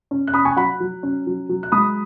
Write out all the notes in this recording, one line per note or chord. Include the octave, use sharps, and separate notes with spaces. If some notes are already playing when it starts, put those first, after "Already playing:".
C#4
F#6
C#4 B5 D#6
G#5 C#6
F#3 F#5 B5
F#3
C#4
F#3
F#3
F#6
G#3 B5 D#6